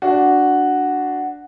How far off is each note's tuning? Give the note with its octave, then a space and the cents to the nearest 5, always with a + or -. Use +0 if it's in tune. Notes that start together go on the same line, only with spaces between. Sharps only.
D4 +0 F#4 +0